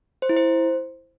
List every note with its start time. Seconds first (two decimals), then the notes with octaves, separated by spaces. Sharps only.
0.22 C5
0.29 E4
0.37 C5